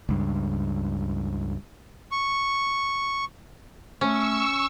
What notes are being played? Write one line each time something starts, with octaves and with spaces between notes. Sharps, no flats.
C#2 G2
C#6
A3 C#4 C#6 E6